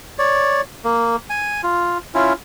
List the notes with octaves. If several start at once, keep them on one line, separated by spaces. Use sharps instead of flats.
C#5 D5
A#3
G#5
F4
C#4 E4 F4